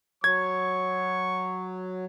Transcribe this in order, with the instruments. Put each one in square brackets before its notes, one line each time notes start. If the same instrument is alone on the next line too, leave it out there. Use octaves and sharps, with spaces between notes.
[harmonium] F#3 [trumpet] C#6 [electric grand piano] G#6